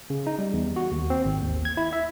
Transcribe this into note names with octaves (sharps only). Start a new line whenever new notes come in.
C#3
D#4
G3
E2
F#4
D#2
C4
G#1
D#2
G#6
E4
E5